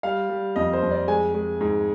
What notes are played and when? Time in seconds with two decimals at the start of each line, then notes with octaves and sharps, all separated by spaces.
0.03 G3 F5
0.29 G3
0.56 F2 D#5
0.73 C5
0.82 F2
0.91 D5
1.08 G#3 G#5
1.34 G#3
1.61 G#2